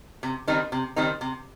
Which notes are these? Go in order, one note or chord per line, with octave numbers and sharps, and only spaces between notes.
C3
D#3 G3 C4 D#4
C3
D#3 G3 C4 D#4
C3